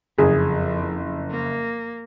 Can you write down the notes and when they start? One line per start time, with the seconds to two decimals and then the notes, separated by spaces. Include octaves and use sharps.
0.18 F#1 F2 G#4
1.31 A#3